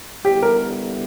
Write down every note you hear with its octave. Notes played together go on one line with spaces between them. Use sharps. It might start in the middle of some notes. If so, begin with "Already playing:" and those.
D3 G3 B3 E4 G4
A#4